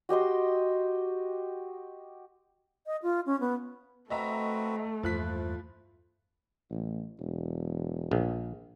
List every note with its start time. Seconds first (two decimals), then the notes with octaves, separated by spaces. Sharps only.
0.09 F#4 G4 D#5 C6
2.86 D#5
3.03 F4
3.26 C#4
3.40 B3
4.10 A3 C4 F#4 B4 D#5 E5 A#5
5.03 E2 G2 F3 A#3 E4 F#6 B6
6.71 A1
7.20 E1
8.11 A#1